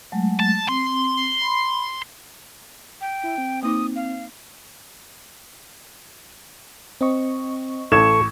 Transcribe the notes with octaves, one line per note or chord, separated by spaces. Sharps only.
F#3 G#3 A3
A5
C4 C6
B5
G5
E4
C4
A#3 D#4 D6 D#6
F5
C4 D#5 C#6
A1 A4 C#6 G#6 E7